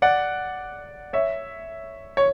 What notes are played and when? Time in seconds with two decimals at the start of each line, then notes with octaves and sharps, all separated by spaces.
0.02 D5 F#5
1.13 C#5 E5
2.17 C#5